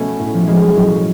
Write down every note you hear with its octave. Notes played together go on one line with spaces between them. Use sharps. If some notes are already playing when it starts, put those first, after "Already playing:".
Already playing: B2 A3 B3 C#4
A2
F3
B2 F3 G#3
F#3
A2 F#3
F3